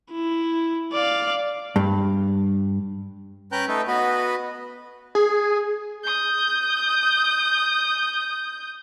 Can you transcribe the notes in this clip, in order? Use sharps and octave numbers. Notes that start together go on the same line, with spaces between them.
E4
D5 F5
G2
C#4 B4 G5 A#5 F#6 G6
A3 D#4 A4 B4
B3 F#4 B4 D#5 B5
G#4
D#6 G6